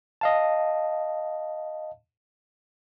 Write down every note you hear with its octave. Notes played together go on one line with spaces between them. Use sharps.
D#5 F5 A5